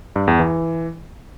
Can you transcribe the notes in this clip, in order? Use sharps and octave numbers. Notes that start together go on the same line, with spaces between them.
G2
E2
E3